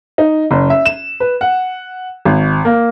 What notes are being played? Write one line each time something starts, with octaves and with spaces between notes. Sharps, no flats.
D#4
F#1
E5
E7
B4
F#5
G#1
A#3